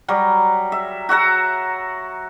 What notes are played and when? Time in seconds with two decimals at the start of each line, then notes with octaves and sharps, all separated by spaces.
0.08 F#3 G3
0.72 E5
1.09 F#4 E5 F#5 A#5